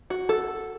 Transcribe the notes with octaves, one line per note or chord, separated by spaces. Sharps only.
F#4
A4